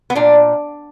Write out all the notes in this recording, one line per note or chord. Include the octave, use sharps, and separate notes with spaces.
B3
A#2 D4